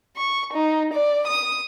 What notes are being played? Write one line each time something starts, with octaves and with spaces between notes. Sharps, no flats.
C#6
D#4
D5
D#6